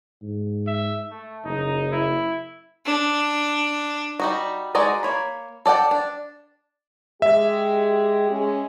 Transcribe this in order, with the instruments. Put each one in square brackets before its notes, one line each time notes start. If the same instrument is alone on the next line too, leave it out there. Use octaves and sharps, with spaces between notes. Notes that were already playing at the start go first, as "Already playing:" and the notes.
[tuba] G#2
[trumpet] E5
A3
[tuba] F#1 [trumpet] D#4
[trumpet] E4
[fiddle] D4
[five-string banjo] G3 D#4 F#4
G#3 D#4 F#4 D5 D#5
A#3 C#5 B5
A4 D5 F#5 G5
D4
[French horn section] G#3 G4 [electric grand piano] E5
[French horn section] G#3 C#4